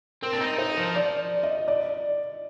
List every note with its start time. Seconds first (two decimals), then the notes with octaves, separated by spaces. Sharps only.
0.22 C4 A#4
0.33 D4
0.41 D#4
0.58 D#4 C5
0.77 F3
0.95 D5
1.43 D#5
1.68 D5